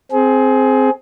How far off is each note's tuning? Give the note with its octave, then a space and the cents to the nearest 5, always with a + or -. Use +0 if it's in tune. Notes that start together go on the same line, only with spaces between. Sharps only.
C4 +0 G#4 +20